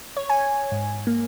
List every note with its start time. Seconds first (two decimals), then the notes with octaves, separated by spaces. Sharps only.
0.17 C#5
0.30 G#5
0.72 G#2
1.07 A#3